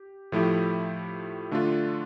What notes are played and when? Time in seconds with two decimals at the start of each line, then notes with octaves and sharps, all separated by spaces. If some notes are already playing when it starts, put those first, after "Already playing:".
Already playing: G4
0.32 A2 F3 A3 E4 G4
1.51 D3 A3 D4 F4